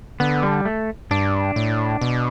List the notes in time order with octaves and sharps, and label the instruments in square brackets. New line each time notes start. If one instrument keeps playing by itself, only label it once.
[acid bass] D3 [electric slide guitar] B3
[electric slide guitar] G3
A3
[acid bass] G2 [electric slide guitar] D4
[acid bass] A2
B2